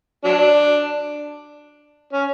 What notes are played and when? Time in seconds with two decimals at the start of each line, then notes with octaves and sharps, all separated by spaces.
0.24 F#3 D4
2.13 C#4